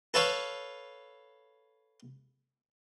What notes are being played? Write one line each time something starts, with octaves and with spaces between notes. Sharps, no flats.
A4 B4 C#5 F5 C#6